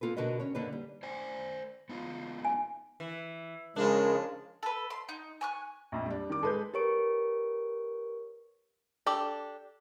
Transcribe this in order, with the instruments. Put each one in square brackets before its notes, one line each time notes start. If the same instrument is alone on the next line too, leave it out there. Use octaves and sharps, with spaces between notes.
[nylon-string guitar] A#3 B3 F4 A4 B4
B2 D3 F#4 A#4 B4 D#5
C#4 C#5
F2 D3 A#3 D4 D#4 B4
G3
[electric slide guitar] C5 D5 G#5
B3 D#4 F4
[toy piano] G#5
[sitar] E3
[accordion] C#3 G#3 [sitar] F3 D4 [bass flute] A#4
[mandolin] A4 B4
C6
D#4
G#5 C#6 F#6
[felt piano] A#1 F2
G3 D4
D#3 D6
[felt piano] G#3 [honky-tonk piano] A4 B4 G6
[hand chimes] G4 A#4 B4 C#5 C#6 D7
[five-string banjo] D4 G4 A4 D5